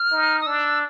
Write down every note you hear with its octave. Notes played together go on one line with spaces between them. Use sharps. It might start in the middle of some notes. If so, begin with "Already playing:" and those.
Already playing: F6
D#4
D#6
D4 E6